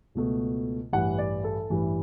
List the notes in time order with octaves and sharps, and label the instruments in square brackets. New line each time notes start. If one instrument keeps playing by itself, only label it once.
[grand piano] C#2 B2 A3
A1 G2 E3 G3 F#5
D5
A4
A1 G2 E3 G3